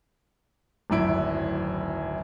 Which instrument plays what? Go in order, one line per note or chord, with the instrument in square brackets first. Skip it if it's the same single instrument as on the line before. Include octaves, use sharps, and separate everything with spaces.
[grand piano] D1 G#1 F#2 E4 D7